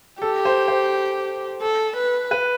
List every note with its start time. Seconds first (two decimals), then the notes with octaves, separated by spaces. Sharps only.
0.22 G4 A4
0.45 C5
0.68 C5
1.62 A4
1.96 B4
2.31 B4